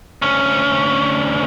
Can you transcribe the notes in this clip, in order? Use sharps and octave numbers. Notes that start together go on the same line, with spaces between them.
D2 C#4